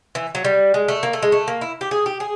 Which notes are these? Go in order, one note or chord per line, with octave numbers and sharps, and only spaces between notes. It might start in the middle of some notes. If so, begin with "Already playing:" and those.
E3
F#3
G3
G#3
A3
A#3
A3
G#3
A3
A#3
E4
G4
G#4
G4
G#4